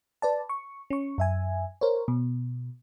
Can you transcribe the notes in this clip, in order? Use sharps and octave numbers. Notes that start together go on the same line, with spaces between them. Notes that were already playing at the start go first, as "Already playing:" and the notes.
B4 D5 A5
C#6
C#4 C#6
F#2 E5 G#5
A#4 C5 C#5
B2